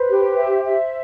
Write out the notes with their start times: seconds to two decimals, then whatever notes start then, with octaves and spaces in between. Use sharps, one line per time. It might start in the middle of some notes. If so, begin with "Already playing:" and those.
Already playing: B4 C5
0.09 G4
0.36 E5
0.64 E5